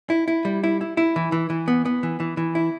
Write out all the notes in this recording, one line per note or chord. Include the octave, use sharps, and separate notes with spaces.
E4
E4
G3
E4
E4
E4
E3
E3
E3
B3
B3
E3
E3
E3
E4